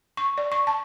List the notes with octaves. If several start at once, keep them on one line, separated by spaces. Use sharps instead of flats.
C#6
D5
C#6
A5